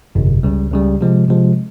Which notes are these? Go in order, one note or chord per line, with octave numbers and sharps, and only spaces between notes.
G1 F2 C3
C#2 C#3 G3
C#2 C#3 G3
C3 F3 G#3
C3 F3 G#3